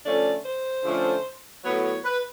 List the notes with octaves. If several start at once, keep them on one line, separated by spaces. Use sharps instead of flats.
D3 F3 A3 C#4 D5
C5
D3 F3 A3 C#4
A2 F#3 B3 C#5
C#5
B4